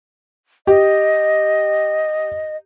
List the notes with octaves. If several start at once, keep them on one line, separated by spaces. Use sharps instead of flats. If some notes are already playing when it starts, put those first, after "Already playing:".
G4 D#5